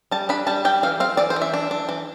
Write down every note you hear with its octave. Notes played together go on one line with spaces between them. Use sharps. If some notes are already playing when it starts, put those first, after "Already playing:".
G3 A5
D4 B5
G3 A5
G3 G5
E3 F5
C4 F5
E3 D5
C5
E3
E5
D4
D4
E3